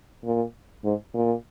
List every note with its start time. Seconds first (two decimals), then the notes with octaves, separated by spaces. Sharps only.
0.24 A#2
0.84 G#2
1.14 A#2